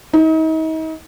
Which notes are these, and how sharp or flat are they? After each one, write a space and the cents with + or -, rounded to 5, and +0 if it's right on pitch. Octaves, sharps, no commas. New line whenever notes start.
D#4 +40